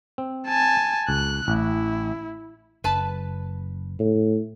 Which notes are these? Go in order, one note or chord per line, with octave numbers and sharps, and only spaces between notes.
C4
G#5 A5
C#2 F#6
A1 E4
F#1 B4 A5
A2